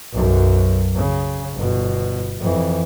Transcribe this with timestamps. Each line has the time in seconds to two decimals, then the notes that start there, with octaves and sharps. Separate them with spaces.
0.13 B1 F#2
0.96 C#3
1.53 G1 B2
2.40 F2 E3